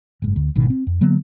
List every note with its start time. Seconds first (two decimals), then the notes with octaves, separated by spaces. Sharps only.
0.22 F#1 G#2
0.36 D2
0.56 G#1 B2 D#3
0.70 C4
0.87 F2
1.01 D3 F#3 A#3 B3